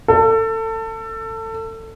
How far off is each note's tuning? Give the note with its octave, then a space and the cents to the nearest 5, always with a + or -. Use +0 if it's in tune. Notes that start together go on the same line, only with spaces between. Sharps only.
A4 +25